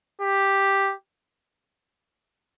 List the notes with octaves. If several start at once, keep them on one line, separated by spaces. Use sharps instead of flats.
G4